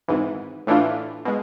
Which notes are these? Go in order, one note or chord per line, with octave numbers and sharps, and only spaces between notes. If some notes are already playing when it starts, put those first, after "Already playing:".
G#1 G#2 E3
A2 E3 A3 D4 F4
B2 G#3